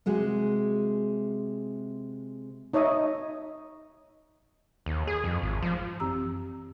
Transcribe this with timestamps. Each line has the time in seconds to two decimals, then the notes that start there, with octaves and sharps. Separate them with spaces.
0.06 C3 G#3 F#4 G#4
2.73 D#4 C#5 D#5 E5 D#6
4.86 D#2
5.07 G#4
5.24 F2
5.42 G#1
5.63 F3
6.00 F#2 E3 C4 G4 A#5 E6